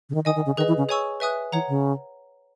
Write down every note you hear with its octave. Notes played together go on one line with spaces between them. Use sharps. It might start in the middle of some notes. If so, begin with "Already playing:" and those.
C#3
D#3
D#3 D#5 G#5 D#6
D#3
C#3
D#3 G#4 B4 D#5
E3
C#3
G#4 C#5 G#5 C#6 E6
B4 E5 G#5 D#6 F#6
E3 C#5 F#5 A#5
C#3